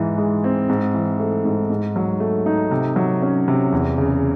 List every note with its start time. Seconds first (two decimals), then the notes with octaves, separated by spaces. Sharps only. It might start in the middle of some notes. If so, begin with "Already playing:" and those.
Already playing: G#2 E3
0.18 G#3
0.44 C4
0.69 G#2
0.94 E3
1.19 A3
1.45 G#2
1.70 G#2
1.96 F#3
2.20 A3
2.46 D#4
2.71 C3
2.96 F#3
3.22 C#4
3.48 C3
3.72 E2
3.98 C#3